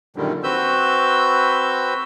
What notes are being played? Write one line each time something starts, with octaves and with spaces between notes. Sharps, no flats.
F#2 A#2 D3 D#3 G3
C4 F#4 B4 E6 G6